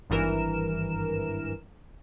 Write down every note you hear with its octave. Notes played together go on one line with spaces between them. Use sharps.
G#1 G2 E3 A#4 E7